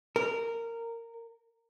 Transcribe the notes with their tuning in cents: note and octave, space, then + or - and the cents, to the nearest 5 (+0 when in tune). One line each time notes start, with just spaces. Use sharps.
A#4 -15